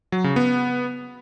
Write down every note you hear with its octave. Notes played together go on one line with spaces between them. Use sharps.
F#3
C#3
B3